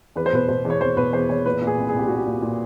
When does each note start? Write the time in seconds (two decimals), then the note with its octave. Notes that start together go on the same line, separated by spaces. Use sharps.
0.16 E2 B4
0.26 C5
0.33 B2 B4
0.49 B2 C5
0.65 E2
0.70 C#5
0.81 E2 C5
0.96 B2 B4
1.13 E2 C5
1.29 E2 C#5
1.46 A#2 B4
1.61 A#2
1.67 G#4
1.78 C2
1.89 G#4
1.95 C2 G4
2.07 A#2 F#4
2.18 G4
2.26 A#2
2.42 A#2